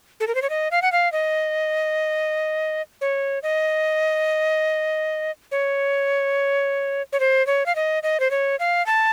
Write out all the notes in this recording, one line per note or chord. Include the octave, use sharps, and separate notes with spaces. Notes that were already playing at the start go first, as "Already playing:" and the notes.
A4
A#4
C5
C#5
D#5
F5
F#5
F5
D#5
C#5
D#5
C#5
C#5
C5
C#5
F5
D#5
D#5
C5
C#5
F5
A5